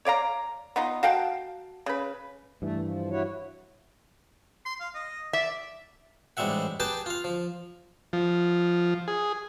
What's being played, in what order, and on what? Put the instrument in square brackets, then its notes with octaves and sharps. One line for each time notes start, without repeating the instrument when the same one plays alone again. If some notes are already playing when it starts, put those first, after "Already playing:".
[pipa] C#5 D5 F5 A#5
B3 D#4 F4 D#5
F#4 F5 G5 A5
C#3 B4
[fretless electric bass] G2 E3 [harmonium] A3
[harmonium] F3
E4 F#4 C#5
[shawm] C6
F5
D#5
[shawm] D5 [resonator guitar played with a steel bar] E5
[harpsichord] A1 G#2 G3 G#3 E5 F#5
G4 G#4 B4 G5 A5
F4 F5
F3
[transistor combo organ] F3
G#4